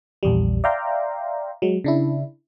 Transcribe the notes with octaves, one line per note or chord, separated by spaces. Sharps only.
A#1 E2 G3
D5 E5 F5 G5 A#5 C6
F#3 G#3
C#3 D4 E4